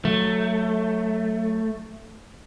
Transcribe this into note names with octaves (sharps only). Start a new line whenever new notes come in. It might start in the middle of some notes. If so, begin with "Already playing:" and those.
F#3 A3